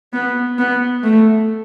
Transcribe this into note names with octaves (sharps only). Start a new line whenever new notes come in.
B3
B3
A3